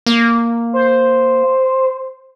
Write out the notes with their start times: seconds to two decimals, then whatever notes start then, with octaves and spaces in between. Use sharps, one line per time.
0.06 A#3
0.73 C5